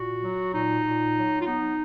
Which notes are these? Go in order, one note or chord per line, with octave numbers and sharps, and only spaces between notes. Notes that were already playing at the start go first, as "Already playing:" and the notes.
Already playing: A#2 F#4
F#3
A#2 D#4
A#2
F#3
F4
B3 D#4